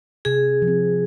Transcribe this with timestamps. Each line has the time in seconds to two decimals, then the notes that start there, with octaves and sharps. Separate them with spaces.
0.25 C3 G#4
0.62 F3
0.68 C4